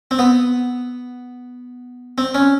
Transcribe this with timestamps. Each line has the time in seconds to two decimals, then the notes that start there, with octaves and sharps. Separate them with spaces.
0.11 C4
0.19 B3
2.18 C4
2.34 C#4